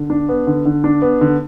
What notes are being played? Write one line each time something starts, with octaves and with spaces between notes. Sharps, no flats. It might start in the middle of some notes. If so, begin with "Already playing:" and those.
Already playing: D3
D4
B3
D3
D3
D4
B3
D3